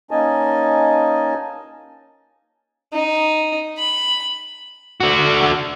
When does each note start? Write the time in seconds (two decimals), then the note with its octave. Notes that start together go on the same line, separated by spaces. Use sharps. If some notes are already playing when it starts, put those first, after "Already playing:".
0.11 A#3 C#4 D#4 D#5 G#5 A5
2.93 D#4
3.78 B5
5.00 D3 F#4